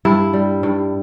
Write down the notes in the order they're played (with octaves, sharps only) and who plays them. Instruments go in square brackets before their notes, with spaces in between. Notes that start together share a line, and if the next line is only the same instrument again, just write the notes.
[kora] G2 E4
G3
G2